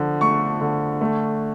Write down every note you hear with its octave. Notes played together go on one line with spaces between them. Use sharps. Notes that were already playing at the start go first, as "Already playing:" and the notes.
Already playing: D3 F3
A3 C#6
D3
A3